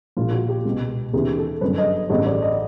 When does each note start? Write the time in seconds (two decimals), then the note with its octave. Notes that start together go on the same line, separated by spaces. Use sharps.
0.17 A#1 A#2 F4
0.33 F#4
0.49 G4
0.65 C#2 B2
1.13 D#2 C#3 E3 G#4
1.38 A4
1.61 G1 F#2 D3 B4
1.78 D#5
2.10 A1 G2 D3 D#5
2.26 D5
2.42 D#5